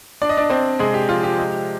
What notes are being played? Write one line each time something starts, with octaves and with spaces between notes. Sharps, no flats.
D4 D5
D#5
D4 D5
C4 D4 C5
C3 G#3 G#4
G4
F3 F4
G4
G#3